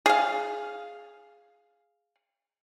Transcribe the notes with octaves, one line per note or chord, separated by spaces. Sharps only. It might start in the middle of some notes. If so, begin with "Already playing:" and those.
G#4 F5